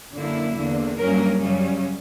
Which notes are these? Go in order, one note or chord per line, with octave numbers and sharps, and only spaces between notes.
F#2 D3 A#3 E4
E2 D3 A#3
G2 F#3 A#3 C#4 A#4
F#2 C#3 G3 C#4